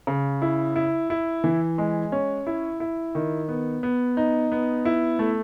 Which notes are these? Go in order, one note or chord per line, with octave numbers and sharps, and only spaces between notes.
C#3
E4
E4
E4
E3
G#3
C#4
E4
E4
D#3
B3
B3
D#4
B3
E4
A3